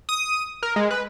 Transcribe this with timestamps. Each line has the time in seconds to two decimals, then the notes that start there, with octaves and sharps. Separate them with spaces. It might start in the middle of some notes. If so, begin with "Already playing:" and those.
0.09 D#6
0.63 A#4
0.76 G#3
0.91 B4